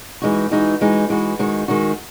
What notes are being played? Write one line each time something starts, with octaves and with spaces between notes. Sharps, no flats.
E3 G#3 D#4 F#4
E3 G#3 D#4 F#4
E3 G#3 D#4 F#4
E3 G#3 D#4 F#4
D#3 G#3 D#4 F#4
D#3 G#3 D#4 F#4